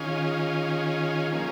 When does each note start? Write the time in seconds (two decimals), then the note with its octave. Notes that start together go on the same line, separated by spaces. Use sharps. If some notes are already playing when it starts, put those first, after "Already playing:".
Already playing: D#3 C#4 F4 G#4
1.31 F3 A#3 C#4 G#4